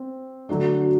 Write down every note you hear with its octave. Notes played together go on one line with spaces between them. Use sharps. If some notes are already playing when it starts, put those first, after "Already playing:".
Already playing: C4
D3 F#3 A3 D4